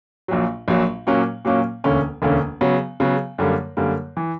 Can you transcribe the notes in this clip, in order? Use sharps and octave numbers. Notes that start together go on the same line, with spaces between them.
A#1 A#2 F#3
A#1 A#2 F#3
A#2 F#3 A#3 C#4
A#2 F#3 A#3 C#4
E1 D2 D3 A#3 C#4
E1 D2 D3 A#3 C#4
C#3 F#3 B3
C#3 F#3 B3
F#2 D3 G3 A#3
F#2 D3 G3 A#3
E3